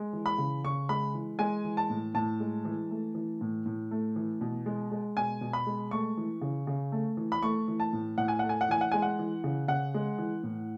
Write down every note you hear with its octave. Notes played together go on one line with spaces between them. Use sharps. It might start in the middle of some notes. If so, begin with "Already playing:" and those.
Already playing: G#3
E3
B5
C#3
C#3 C#6
G#3 B5
E3
G#3 G#5
E3
A5
A2
A2 A5
G#3
E3
A3
E3
A2
A2
A3
E3
B2
G#3
G#3
B2 G#5
B2
B5
G#3
A3 C#6
E3
C#3
C#3
A3
E3
B5
A3 C#6
E3
A5
A2
A2 F#5
G#5
A3 F#5
G#5
F#5
E3 G#5
F#5
G#3 G#5
F#5
E3
C#3
C#3 F#5
G#3
E3
A2